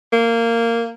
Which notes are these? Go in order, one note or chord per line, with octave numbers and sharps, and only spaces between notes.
A#3